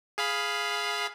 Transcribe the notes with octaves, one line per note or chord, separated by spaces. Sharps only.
G#4 F5 B5